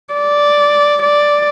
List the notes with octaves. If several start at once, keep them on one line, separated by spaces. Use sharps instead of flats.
D5
D5